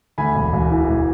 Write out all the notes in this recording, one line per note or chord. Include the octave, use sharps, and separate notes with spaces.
D2 G#5 B5
E1
E1
E3
E1